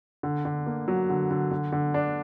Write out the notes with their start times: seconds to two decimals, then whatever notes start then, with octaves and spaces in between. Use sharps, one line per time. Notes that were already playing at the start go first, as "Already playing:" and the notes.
0.23 D3
0.45 D3
0.66 A#3
0.88 F#3
1.09 D3
1.31 D3
1.51 D3
1.72 D3
1.94 D4